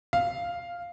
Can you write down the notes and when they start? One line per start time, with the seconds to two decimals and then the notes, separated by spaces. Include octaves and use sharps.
0.13 F5